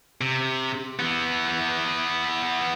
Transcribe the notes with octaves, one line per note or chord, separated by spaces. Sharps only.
C3
E3 B3